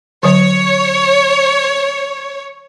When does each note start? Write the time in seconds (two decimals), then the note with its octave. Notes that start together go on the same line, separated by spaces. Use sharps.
0.23 D3 F#3 C#5